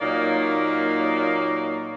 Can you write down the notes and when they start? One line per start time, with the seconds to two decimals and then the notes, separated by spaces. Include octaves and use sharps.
0.01 A#2 F#3 A#3 D#4 D5